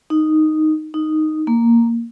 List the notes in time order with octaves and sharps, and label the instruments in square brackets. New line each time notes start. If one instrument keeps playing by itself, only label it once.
[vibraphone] D#4
D#4
A#3